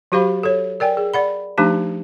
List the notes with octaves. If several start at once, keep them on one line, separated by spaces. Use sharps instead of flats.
F#3 F#4 G4 C5 F5 B5
A4 C#5
A#4 D5 G5 G#5
G#4
D5 F#5 B5
F3 A3 D4 D#4 G4 A5